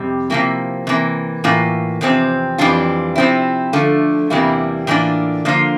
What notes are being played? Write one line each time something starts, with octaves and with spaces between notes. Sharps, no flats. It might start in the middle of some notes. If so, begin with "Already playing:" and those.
Already playing: F2 C3 G3
C3 F3 A#3 E4
C3 E3 A#3
A2 E3 A#3 F4
E2 C3 F3 C4
F2 E3 G3 D4 F4
C3 F3 C4 E4
D3 F3 A3
E2 C3 G3 A#3 E4
A2 E3 A#3 D4 F4
D3 F3 A#3 F4